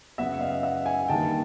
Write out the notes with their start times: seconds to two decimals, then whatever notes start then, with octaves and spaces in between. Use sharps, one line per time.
0.18 F#2 C#3 F#3 B3 E5 F#5
0.41 D#5 F5
0.63 E5 F#5
0.86 F#5 G#5
1.08 G2 D#3 G3 A#3 G5 A5